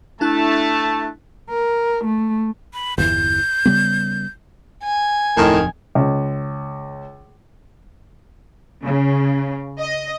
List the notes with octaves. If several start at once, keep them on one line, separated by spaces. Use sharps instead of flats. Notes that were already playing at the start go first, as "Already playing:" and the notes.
A3 D4 E4 A5 F#6
A#4
A3
B5
G1 E2 E3 G6
C#3 G3 B3
G#5
D1 F2 A2 D#3
C#2
C#3
D#5